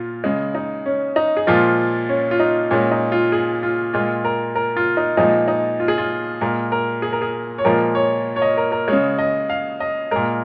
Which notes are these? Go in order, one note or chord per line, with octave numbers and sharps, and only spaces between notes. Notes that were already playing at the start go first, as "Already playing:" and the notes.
Already playing: A#2 F4
C#3 G#3
D#4
C#4
D#4
G#4
A#2 F3 G#3 F4
C#4
F4
D#4
A#2 G#3 C#4
D#4
F4
G#4
F4
A#2 G#3 F4
A#4
A#4
F4
D#4
A#2 F3 G#3 D#4
D#4
F4
G#4
F4
A#2 G#3 A#4
A#4
G#4
A#4
G#4
C#5
A#2 F3 G#3 A#4
C#5
C#5
D#5
A#4
A#4
C#3 G#3 C#5
D#5
F5
D#5
A#2 G#3 A#4